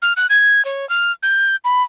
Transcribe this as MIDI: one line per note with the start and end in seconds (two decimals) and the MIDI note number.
0.02 0.13 89
0.17 0.27 90
0.30 0.64 92
0.65 0.88 73
0.90 1.12 89
1.23 1.56 91
1.65 1.83 83